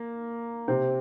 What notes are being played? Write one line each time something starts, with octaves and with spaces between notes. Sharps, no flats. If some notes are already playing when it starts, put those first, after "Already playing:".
Already playing: A#3
C3 C4